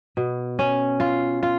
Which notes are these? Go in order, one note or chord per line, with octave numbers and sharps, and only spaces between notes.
B2
C#4
F4
F4